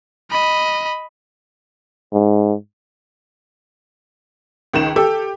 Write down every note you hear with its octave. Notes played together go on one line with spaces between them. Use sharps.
D#5 B5
G#2
C#2 D#3 E7
G4 A4